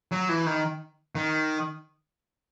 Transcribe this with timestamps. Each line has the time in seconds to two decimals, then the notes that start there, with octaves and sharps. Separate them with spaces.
0.11 F#3
0.29 E3
0.46 D#3
1.15 D#3